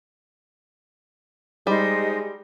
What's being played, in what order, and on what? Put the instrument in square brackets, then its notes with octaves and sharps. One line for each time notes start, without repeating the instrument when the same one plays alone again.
[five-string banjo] G3 [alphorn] G#3 [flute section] D#4 C5 D#6 [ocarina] G4